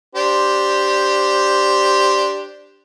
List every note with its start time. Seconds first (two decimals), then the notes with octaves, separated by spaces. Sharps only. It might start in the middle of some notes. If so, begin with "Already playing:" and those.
0.15 D4 G4 C5